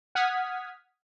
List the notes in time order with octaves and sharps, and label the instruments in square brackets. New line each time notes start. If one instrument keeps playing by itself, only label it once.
[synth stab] F#5 D#6 F6 G#6 B6